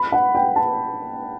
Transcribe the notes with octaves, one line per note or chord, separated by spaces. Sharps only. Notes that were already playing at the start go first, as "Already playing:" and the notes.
Already playing: B5
F#5
G5
A5